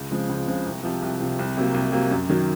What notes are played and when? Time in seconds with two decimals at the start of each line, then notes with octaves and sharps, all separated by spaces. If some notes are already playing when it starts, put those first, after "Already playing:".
Already playing: C#2
0.11 C#3 F3 G#3 C4
0.29 C#2
0.48 C#3 F3 G#3 C4
0.66 C2
0.83 C3 F3
1.02 C2
1.20 C3 F3
1.39 C2
1.57 C3 F#3 A#3
1.74 C2
1.92 C3 F#3 A#3
2.11 F#2
2.29 D#3 F#3